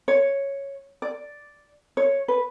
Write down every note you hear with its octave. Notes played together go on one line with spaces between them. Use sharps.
C#5
D5
C#5
B4